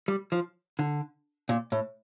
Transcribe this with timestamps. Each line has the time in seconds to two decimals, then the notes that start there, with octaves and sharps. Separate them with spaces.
0.08 G3
0.32 F3
0.79 D3
1.49 A#2
1.72 A2